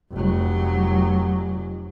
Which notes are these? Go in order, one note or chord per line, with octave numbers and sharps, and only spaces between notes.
F1 F#3